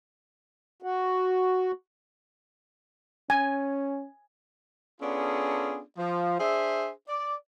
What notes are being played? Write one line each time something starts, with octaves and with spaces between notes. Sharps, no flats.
F#4
C#4 G#5
B3 C#4 D4 F4 G#4 A4
F3
D4 G#4 C5 E5
D5